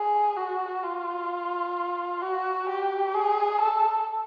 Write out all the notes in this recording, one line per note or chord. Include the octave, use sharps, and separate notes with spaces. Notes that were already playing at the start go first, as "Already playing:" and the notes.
Already playing: G#4
F#4
F4
F#4
G4
G#4
A4